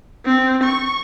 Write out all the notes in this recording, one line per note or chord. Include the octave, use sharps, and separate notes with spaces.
C4
C#6